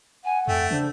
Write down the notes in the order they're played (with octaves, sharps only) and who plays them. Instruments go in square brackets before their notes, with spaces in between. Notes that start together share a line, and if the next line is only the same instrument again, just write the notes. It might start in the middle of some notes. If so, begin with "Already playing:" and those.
[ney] F#5 [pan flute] G#5
[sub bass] F2 [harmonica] A3 [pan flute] G5
[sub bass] C#3 [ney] D4 [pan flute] C5